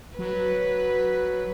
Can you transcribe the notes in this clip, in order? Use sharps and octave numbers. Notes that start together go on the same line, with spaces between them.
F#3 B4